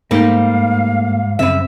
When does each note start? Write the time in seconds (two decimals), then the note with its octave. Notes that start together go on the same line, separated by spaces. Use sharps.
0.11 G#2 G3 A3 A#3 C4 D#4 F5
1.39 F#2 C#3 G3 C4 E5